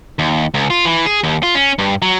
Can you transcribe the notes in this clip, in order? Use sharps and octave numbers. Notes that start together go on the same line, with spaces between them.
D#2
C#2
F4
E3
G#4
D#2
F4
C#4
G2
F#3